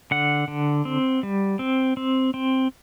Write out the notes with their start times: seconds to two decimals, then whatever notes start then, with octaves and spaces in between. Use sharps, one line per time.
0.11 D3 F#5
0.48 D3
0.85 C4
1.23 G3
1.59 C4
1.97 C4
2.34 C4